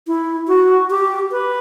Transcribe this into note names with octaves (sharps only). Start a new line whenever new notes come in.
E4
F#4
G4
B4